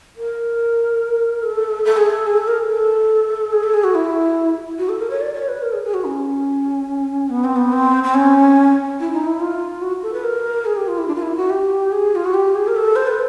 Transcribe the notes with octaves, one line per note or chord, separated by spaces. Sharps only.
A#4
A4
A4
G#4
A4
G#4
A4
A#4
A4
G#4
A4
G#4
F#4
E4
F#4
A4
A#4
C#5
D5
C#5
B4
A#4
G#4
G#4
F#4
C#4
B3
C4
B3
C4
C4
C#4
E4
D#4
E4
F4
F#4
A4
B4
A#4
G#4
G4
F4
E4
D4
F4
E4
F#4
G4
G#4
F4
F#4
G4
G#4
A#4
A4
C5
B4